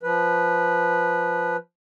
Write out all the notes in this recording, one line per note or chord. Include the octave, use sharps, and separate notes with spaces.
F3 B4